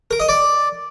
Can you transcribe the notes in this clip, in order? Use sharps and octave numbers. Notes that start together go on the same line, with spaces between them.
A#4
D#5
D5